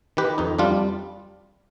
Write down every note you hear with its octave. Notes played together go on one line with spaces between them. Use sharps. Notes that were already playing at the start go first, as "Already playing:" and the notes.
D#3 G4 B4
F2 D#4
G3 D4 F4